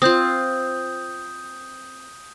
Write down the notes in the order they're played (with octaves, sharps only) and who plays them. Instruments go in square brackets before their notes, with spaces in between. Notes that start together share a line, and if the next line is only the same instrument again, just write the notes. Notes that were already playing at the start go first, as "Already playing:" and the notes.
[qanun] C4 F4 [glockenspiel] D#6 G6